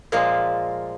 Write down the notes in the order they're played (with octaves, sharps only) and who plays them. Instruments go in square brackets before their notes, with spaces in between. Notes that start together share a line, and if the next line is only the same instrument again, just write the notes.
[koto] A#2 F3 G#3 A#3